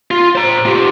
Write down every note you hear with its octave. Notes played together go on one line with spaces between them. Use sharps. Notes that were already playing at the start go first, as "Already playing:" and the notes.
F4
C5 A#5
F4 G4